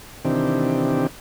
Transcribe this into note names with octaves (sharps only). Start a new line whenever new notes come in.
C3 D#3 E3 C4 D4 G4